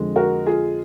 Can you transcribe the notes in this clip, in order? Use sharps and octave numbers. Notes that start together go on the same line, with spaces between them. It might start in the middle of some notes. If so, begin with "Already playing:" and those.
Already playing: F2 D3 G#3
F#4 A#4
F4 G#4